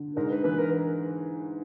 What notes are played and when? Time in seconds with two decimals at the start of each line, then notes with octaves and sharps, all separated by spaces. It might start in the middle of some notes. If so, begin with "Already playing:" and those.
Already playing: D3
0.16 G#2 A#4
0.30 B4
0.44 E3 B4
0.58 A#4